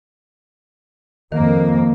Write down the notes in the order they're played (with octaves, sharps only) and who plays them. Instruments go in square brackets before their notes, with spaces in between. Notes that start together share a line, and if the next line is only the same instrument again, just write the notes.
[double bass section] F2 A#3 [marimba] D#3